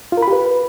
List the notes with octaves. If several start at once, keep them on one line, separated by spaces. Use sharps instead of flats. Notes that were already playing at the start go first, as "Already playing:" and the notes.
F4
A#4
B5
G4
B4